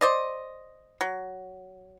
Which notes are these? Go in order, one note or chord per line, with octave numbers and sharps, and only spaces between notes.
C5 D5 D#5
F#3